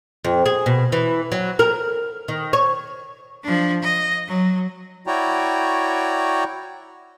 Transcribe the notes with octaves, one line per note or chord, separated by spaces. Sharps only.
F2
G#4
B2
E3
F#3
A#4
D#3
C#5
F3 D4
D#5
F#3
E4 F#4 C#5 D5 G5 A#5